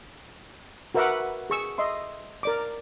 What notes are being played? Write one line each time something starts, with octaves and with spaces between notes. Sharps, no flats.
F#4 A#4 B4 E5 F#5 D6
G#4 C#6 E6
D#5 E5 C6
A#4 D5 D6